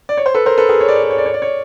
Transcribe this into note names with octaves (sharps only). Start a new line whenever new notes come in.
D5
C#5
C5
A4 B4
A#4 C5
A4 B4
G#4 A#4
C#5
D5
C#5
D5
C#5
D5
C#5
D5
C#5